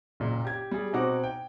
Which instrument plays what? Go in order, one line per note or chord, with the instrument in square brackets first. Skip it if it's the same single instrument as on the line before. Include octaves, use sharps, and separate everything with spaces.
[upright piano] F#1 A#2
G4 G#6
G3 G#4
B2 C4 D#4 F#4 F#5 D6
G5